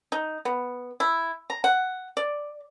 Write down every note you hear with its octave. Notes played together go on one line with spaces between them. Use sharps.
D#4
B3
E4
A#5
F#5
D5